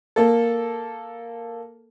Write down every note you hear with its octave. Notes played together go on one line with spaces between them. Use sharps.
A#3 A4